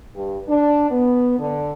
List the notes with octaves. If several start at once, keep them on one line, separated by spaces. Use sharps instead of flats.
G2
D4
B3
D3